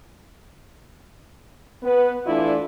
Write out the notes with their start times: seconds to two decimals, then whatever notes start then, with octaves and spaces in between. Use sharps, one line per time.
1.83 B3 B4
2.26 E3 A3 D4 E4 F4 D5